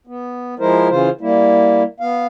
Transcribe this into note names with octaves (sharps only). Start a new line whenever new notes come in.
B3
F3 G#3 E4 A#4 C5
C#3 E3 F4 C5
G3 A#3 E4
B3 F5